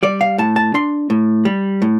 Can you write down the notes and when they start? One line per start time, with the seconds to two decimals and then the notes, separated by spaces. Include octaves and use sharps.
0.03 G3 D5
0.21 F5
0.38 A2 A5
0.56 A5
0.74 D4 C6
1.10 A2
1.45 G3
1.82 A2